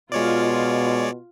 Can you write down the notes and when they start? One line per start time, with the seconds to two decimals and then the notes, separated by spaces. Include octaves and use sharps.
0.12 B2 G#3 F4 C#5 D5